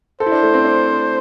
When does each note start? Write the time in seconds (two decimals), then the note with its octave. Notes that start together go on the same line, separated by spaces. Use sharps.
0.20 A4 C5
0.26 E4
0.32 D4
0.43 A3
0.54 C4
0.65 D4